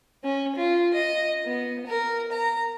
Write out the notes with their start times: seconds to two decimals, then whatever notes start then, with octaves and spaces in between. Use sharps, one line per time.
0.24 C#4
0.56 F4
0.94 D#5
1.45 B3
1.86 A#4
2.32 A#5